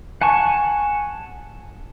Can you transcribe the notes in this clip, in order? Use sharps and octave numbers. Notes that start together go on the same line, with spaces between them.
F#5 G#5 A5 C#6